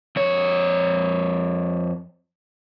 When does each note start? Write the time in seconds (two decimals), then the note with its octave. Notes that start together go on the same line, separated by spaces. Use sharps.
0.16 F2 C#5